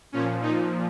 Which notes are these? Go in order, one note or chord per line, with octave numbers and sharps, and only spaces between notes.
A#2 F3 C#4
A#2 F3 D#4